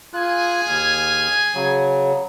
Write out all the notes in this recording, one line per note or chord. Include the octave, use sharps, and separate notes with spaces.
F4 G#4 G#5 F#6
D#2 F6
C#3 F#3